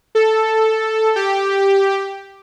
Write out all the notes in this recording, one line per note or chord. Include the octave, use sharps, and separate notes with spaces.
A4
G4